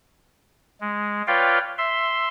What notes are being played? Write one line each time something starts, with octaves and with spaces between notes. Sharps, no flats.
G#3
F4 B4 C#5 D5 F5 G5
E5 C6